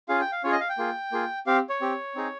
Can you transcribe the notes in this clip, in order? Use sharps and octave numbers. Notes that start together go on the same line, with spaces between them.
C#4 F4 G#4 F5
G5
F5
C#4 F4 G#4 C#5
D#5
F5
G5
A#3 F4 G#4
A#3 F4 G#4
C4 G4 F5
C#5
C4 G4
C4 D#4 G#4